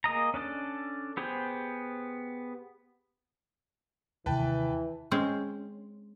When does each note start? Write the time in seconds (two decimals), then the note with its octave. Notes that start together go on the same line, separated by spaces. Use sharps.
0.04 A#3 G#4 D#5 A#5
0.34 C#4 D4 A4 D5
1.17 B3 G4 G#4 C5
4.26 D#2 C3 D#3 E3 B4 G5 A5
5.11 G#3 C4 C#4